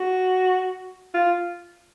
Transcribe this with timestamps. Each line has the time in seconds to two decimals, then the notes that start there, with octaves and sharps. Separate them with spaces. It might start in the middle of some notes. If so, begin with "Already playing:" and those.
Already playing: F#4
1.14 F4